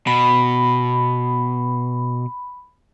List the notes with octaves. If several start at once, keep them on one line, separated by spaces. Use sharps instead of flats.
B2 B5